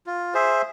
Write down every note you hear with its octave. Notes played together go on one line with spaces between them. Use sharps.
F4
G#4 C5 E5